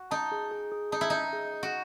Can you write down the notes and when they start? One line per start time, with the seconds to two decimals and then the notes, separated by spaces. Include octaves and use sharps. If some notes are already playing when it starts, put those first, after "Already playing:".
Already playing: F#4
0.11 D#4 A5
0.32 G#4
0.51 G#4
0.72 G#4
0.92 D#4 A5
1.01 E4
1.10 D#4 D#5
1.33 G#4
1.53 D#5
1.63 F#4